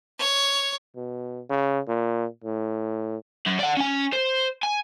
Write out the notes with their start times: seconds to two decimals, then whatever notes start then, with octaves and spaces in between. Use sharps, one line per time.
0.18 C#5
0.96 B2
1.50 C#3
1.88 A#2
2.44 A2
3.47 F#2
3.59 D5 F#5
3.77 C#4 G#5
4.13 C5
4.63 G#5